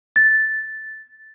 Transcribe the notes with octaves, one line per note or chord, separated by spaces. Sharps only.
A6